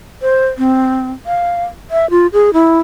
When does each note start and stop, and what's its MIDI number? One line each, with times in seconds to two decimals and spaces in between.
0.22 0.47 72
0.58 1.11 60
1.26 1.65 77
1.91 2.09 76
2.10 2.27 65
2.33 2.53 68
2.53 2.79 64